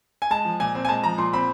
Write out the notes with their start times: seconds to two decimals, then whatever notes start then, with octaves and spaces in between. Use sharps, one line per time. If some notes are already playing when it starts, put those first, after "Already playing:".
0.22 G#5
0.30 G#3 A5
0.45 F3
0.60 A#2 G#5
0.75 C4
0.85 G#5
0.89 G#3 A5
1.04 F3 A#5
1.18 A#2 C6
1.33 C4 B5